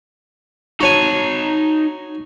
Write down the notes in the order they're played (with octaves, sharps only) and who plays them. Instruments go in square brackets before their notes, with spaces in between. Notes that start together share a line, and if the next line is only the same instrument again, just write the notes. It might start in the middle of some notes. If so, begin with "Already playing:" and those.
[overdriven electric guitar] D#4 A5 [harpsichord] F#4 C#5 G#5